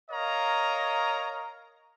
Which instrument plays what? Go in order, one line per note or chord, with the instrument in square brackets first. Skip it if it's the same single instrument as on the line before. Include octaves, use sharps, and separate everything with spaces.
[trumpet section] A#4 C#5 D#5 F5 A#5